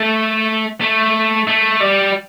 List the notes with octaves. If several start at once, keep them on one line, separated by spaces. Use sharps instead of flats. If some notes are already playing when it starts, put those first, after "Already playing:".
Already playing: A3
A3
A3
G3